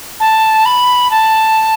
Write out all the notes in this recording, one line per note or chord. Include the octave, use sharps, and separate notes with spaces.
A5
B5
A5